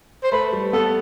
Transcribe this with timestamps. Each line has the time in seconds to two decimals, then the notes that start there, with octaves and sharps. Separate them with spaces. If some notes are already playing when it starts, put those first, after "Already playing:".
0.24 C5
0.32 A3 B4
0.52 G3
0.73 B3 A4